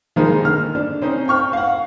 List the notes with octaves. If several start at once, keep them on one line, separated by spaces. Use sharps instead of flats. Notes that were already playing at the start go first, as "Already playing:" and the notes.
D#3 F3 G3 G#3 A#3 D#4
D3 F6
D4
C4 C#4 D#4 C5
G5 C#6 F6
F5 F#5